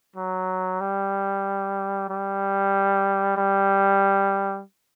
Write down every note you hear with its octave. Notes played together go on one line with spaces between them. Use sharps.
F#3
G3
G3
G3